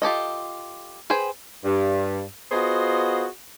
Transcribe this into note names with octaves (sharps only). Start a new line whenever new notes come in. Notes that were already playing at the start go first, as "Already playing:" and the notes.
F4 G4 A4 D#5
G#4 B4 C5 G5
G2
B3 F4 F#4 G#4 C5 D#5